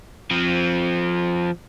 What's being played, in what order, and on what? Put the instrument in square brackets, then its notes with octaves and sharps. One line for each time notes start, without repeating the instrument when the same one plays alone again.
[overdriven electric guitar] F3 C4